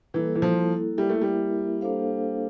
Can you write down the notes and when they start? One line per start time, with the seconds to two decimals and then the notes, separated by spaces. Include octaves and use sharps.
0.14 E3 G3 A#3 E4 A4
0.35 E3
0.42 F3
0.98 G3 A#3 E4 A#4 E5
1.09 A3
1.22 G3
1.81 A#3 D4 A4 C5 F5